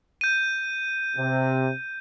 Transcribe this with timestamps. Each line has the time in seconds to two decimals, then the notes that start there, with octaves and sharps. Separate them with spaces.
0.21 G6 D#7
1.17 C3